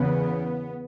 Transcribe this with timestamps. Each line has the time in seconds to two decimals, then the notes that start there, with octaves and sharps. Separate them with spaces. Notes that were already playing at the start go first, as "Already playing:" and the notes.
Already playing: E2 C#3 B3